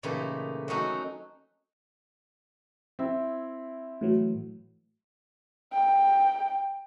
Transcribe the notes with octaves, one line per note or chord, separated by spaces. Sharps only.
A#2 C#3 E3 A3 D#4 G4
F#3 A3 C4 C#4 D#4 F#4
C4 E4
A2 E3 F#3
G5